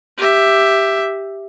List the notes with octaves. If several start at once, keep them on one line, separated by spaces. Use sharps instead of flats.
G4 E5